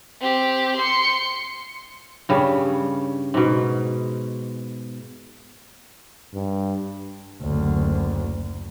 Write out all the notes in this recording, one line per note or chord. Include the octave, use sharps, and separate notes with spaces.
C4 G4
C6 C#7
G2 C#3 G3
G#2 B2
G2
F#1 D2